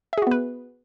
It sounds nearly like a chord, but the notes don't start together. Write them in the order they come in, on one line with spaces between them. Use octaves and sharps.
E5 G#4 F#4 B3 B4